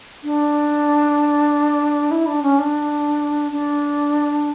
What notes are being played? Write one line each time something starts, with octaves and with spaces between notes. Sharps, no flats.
D4
E4
D4
C#4
D4
D4